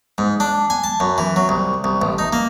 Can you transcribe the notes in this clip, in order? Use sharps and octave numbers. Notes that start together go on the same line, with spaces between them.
G#2
D4
G#5
A5
F#2
E3
F#3
C2
C2
A1
D#4
A#3